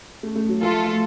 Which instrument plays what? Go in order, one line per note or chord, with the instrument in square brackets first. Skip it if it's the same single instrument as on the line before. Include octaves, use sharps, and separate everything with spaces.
[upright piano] A3
A3
F#3
[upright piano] F3 [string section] A3 F4 A4